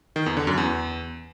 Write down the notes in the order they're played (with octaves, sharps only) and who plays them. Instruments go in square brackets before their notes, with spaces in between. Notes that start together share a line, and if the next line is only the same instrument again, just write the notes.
[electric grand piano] D#3
E2
D3
F#2
E2